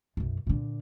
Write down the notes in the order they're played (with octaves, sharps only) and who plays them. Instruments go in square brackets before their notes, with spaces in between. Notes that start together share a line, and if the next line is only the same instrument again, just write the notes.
[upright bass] B1 F#2
A#2 D3